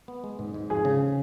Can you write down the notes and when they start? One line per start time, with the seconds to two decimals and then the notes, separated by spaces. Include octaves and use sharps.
0.08 B3
0.24 G#3
0.39 G#2
0.54 G#2
0.70 F3 G#4
0.85 C#3